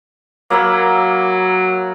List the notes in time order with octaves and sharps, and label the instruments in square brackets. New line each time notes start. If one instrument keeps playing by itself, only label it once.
[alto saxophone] F#3 [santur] A#3 E5 B5